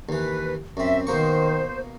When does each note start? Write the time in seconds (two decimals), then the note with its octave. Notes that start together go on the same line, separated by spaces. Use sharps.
0.09 D#2 E3 B4
0.77 F#2 C4 E5
1.07 B2 D#3 A#3 C5 C#6